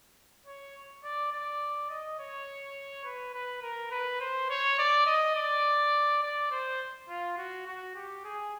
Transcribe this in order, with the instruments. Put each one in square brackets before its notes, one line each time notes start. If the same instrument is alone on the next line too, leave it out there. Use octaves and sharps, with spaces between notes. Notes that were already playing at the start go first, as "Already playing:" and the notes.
[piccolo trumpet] C#5
D5
D5
D#5
C#5
B4
B4
A#4
B4
C5
C#5
D5
D#5
D5
D5
C5
F4
F#4
F#4
G4
G#4